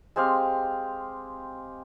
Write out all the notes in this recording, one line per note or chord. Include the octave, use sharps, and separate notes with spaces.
G#3 C4 G4 F5